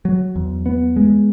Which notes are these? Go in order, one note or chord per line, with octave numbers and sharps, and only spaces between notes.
F#3
E2
B3
G#3